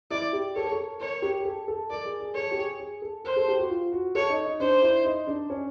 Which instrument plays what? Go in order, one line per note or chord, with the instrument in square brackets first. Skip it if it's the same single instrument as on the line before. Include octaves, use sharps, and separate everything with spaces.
[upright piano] E4 [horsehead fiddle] D5
[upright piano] G4
[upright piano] A4 [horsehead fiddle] C#5
[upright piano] A#4
A4
[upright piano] A#4 [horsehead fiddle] C#5
[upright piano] G4
G#4
A4
A4
[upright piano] A#4 [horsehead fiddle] D5
[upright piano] G#4
G#4
[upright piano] A4 [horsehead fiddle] C#5
[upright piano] G4
G#4
G#4
A4
[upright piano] A#4 [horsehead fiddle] C5
[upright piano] A4
G4
F#4
F4
F#4
[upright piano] A4 [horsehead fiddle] C#5
[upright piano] D#4
D#4
[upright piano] D4 [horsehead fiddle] C5
[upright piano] E4
D#4
D4
C#4